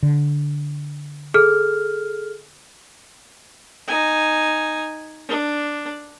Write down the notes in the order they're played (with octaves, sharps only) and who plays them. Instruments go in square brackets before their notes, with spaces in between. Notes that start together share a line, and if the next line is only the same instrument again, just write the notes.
[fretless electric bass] D3
[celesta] G#4 A4 F6
[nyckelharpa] D#4 G#5
D4